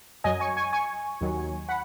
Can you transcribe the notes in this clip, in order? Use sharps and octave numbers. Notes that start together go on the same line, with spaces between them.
F#2 F#3 D#5 G#5
G#5 C#6
G#5 C#6
G#5 C#6
D#2 D#3 F#3
F#5 B5